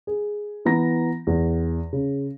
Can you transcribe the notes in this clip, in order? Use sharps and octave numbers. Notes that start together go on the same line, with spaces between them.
G#4
E3 B3 A#5 A#6
E2
C#3